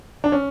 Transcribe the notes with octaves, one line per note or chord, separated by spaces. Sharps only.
D4
C#4